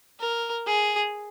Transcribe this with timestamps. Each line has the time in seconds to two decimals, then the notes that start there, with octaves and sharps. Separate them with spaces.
0.20 A#4
0.66 G#4